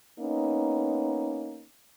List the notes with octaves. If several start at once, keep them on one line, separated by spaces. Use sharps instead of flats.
A#3 B3 C#4 D#4